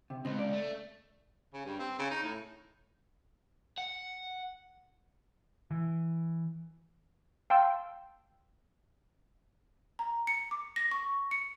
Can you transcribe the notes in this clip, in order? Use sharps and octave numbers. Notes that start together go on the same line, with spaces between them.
C3
C#2 B2 C4
D5
A3
C#3
G2
C4
C#3
D#4
A2
F#5
E3
F5 G5 A5 C6 E6
A#5
C#7
D6
A#6
C#6
C#7